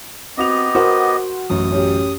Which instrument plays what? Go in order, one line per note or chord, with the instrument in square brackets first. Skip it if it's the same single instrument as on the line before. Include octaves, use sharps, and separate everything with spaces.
[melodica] B3 G4 D#5 [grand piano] C4 F#4 F7
[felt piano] F#4 A#4 F#5 [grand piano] C5
[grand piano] A1 F#2 F#3 [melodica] D#6
[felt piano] C#4 G4